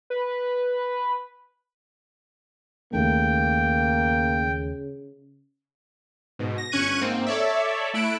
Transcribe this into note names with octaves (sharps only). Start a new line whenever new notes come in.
B4
D#2 C#3 A3 A#3 G5
G#2 B2
A#6
G1 C#4 C#6 F#6 G#6 D#7
G#2 A#3 C4
A4 C#5 D5 E5
A3 E4 E6 F#6 D7